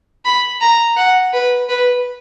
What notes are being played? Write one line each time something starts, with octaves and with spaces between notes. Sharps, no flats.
B5
A#5
F#5
B4
B4